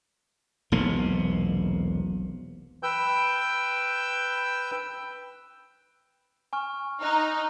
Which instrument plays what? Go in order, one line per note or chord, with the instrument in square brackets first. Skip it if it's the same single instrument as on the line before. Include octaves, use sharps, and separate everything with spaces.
[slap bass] E1 B1 C3 A#3
[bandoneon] B4 G5 E6 G6
[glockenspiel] G#5 C#6 F6
[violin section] D#4 [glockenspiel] F6 F#6